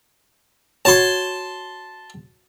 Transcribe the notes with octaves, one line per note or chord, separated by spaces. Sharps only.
F#4 C#5 A5 C6